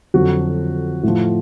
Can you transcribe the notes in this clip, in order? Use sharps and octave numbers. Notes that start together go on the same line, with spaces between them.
F2 D3 F#3 F#4
A2 F3